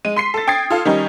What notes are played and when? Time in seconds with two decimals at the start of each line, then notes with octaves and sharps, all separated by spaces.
0.05 G#3 D#7
0.16 C6 B6 C7
0.34 A4 A6
0.47 G5 D#6 G#6 A6 C7
0.70 F4 A4 F5
0.85 D#3 G3 C#4 D#4